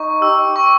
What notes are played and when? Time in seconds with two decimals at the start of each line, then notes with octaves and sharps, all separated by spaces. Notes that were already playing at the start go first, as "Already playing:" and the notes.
Already playing: D#4 C#6
0.21 G4 E6
0.56 C#6